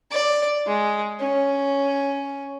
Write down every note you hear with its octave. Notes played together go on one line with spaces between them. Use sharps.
D5
G#3
C#4